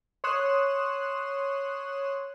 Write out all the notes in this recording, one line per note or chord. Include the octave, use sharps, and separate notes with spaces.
C#5 C6 D#6 F#6 E7